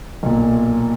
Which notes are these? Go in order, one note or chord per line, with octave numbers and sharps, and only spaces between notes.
B1 A#2